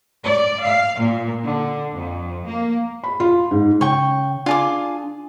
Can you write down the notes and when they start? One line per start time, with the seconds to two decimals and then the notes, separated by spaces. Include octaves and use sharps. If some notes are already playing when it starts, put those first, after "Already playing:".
0.25 D5
0.64 F5
1.00 A#2
1.44 D3
1.94 F2
2.46 A#3
3.04 B5
3.20 F4
3.51 G#2
3.81 C#3 G5 C#6
4.46 D4 F4 G#4 D6